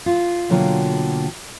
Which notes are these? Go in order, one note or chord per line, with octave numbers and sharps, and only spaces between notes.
F4
B2 D3 F#3 A#3 F4 G5